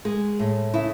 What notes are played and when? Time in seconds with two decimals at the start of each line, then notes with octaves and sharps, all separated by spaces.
0.05 G#3 G#4
0.39 A2
0.73 C#3 E4